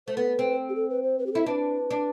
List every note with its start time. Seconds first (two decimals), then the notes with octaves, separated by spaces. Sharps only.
0.07 A3 C5
0.17 B3 B4
0.39 C4
0.69 G4
0.75 A4
0.90 B4
1.03 C5
1.19 B4
1.26 G4
1.32 E4 A4
1.46 D4 B4
1.91 D4